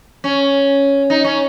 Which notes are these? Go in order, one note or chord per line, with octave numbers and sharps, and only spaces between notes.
C#4
D#4
C#4